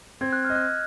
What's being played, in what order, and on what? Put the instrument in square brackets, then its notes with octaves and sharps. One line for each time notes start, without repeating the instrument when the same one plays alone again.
[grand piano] C4 [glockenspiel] G#6
[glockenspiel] F#6
F6
[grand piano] D#5
[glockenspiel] F#6